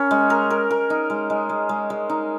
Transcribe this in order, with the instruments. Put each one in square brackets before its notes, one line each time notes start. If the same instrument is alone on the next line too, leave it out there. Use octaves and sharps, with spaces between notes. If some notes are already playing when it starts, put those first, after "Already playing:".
Already playing: [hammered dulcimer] C#4 A#4
G#3
A#4
A#4
A#4
D#4
G#3
G#3
G#3
G#3
G#3
D#4